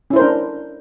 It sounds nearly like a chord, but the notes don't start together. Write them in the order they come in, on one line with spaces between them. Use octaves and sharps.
C#4 E4 C5 A#4 D4